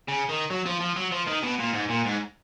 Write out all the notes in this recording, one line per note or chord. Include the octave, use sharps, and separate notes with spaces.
C#3
D#3
F#3
F3
F3
F#3
F3
D#3
B2
A#2
G#2
A#2
G#2